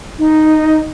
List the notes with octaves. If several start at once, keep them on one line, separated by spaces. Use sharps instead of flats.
D#4